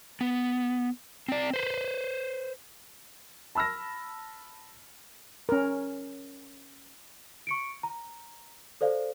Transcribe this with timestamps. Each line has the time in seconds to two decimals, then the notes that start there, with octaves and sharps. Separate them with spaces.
0.21 B3
1.28 C4 D5
1.53 B4 C5
3.55 A5 B5 E6 F6 A#6
5.49 C#4 A#4
7.47 C#6 C#7 D7
7.83 A#5
8.81 A4 C5 D5 F5